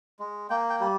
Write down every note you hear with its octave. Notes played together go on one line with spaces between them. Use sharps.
G#3
A#3 G5
G5
G3